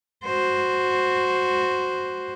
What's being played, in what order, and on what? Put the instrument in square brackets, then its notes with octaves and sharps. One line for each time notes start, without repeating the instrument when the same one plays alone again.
[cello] F#4 C5